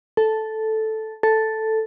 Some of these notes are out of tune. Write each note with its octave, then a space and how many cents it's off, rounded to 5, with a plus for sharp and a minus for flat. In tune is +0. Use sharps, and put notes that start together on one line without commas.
A4 -5
A4 +0